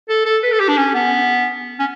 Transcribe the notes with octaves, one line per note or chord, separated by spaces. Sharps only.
A4
A4
B4
A4
G4
D4
C#4
B3
C#4